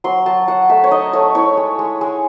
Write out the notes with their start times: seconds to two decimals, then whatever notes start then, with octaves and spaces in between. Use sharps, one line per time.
0.04 F#3 C6
0.26 F#3 A5
0.48 F#3 F#5
0.69 A3 E5
0.84 C#5
0.91 D#4 D#5
1.13 A3 C#5
1.35 E4 C#5
1.57 G#3
1.79 G#3
2.01 G#3